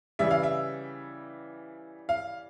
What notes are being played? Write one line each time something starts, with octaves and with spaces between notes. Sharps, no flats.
C#3 E3 G3 E5
F5
E5
F5